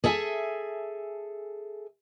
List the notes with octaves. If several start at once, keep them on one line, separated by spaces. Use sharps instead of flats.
G#4 A4 E5 F#5 G#5